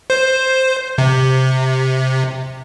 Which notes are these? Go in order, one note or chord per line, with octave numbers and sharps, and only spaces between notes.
C5
C3